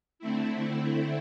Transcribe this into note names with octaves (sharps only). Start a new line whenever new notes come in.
D3 A3 C4 E4